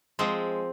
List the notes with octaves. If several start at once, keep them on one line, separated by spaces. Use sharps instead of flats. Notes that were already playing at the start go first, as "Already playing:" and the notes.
F3 G#3 C4